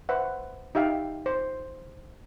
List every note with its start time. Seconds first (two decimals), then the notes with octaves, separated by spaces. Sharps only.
0.09 B4 C5 E5 F#5
0.75 D#4 G4 E5 F5 G5
1.26 C5